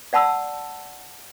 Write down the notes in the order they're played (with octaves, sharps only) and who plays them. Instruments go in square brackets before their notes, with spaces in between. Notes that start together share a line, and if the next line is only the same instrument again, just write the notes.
[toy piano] D5 F#5 A5 B5 E6